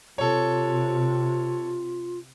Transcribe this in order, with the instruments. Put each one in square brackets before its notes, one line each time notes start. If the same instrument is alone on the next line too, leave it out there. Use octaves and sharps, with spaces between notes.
[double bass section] C3 [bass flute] F4 [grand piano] A4 C#5